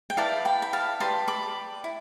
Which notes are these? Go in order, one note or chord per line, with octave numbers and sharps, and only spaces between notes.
G5
E4 B4 D5 F5 A5
G5 B5
B5
F5 A5
G4 B4 D5 A5 C6
B5 D6
E4